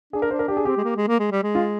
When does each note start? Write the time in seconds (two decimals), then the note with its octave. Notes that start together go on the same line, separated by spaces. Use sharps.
0.13 D4 G#4
0.22 A#4
0.31 D4 C5
0.39 A#4
0.48 D4 G4
0.57 G#4
0.65 C4 G4
0.77 G#3
0.84 A#3
0.96 G#3
1.08 A#3
1.19 G#3
1.32 G3
1.43 G#3
1.55 F4